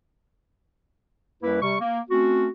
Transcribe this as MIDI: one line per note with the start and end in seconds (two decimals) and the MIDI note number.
1.43 1.61 42
1.43 1.61 55
1.43 1.61 58
1.43 1.61 64
1.43 1.61 71
1.62 1.75 48
1.62 1.75 55
1.62 1.75 85
1.80 2.00 58
2.10 2.47 57
2.10 2.47 60
2.10 2.47 61
2.10 2.47 66